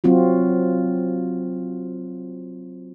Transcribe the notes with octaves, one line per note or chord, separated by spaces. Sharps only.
F#3 C4 F4 F#4